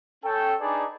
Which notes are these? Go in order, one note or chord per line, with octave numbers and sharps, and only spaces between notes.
C#4 A4 G5
D4 D#4 G#4 B4 D5 G#5